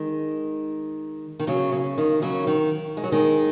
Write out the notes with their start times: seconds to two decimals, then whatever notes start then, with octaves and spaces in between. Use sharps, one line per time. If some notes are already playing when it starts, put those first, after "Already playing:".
Already playing: D#3 G#3
1.40 D#3
1.47 C#3 F#3
1.72 C#3
1.98 D#3
2.22 C#3 F#3
2.47 D#3
2.97 G#3
3.03 F#3
3.12 D#3 G#3